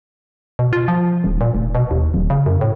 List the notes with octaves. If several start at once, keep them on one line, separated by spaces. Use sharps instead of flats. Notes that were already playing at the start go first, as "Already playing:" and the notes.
B2
F4
F3
D#1
A#2
F1
B2
D#2
D1
C#3
F#2
A2